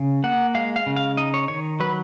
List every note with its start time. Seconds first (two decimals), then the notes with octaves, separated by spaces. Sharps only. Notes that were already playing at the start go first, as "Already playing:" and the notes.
Already playing: C#3
0.24 A#3 F#5
0.55 G#3 F5
0.76 F5
0.86 C#3
0.96 F5
1.17 D#4 D#5
1.34 C#5
1.48 D#3 C#5
1.80 F#3 B4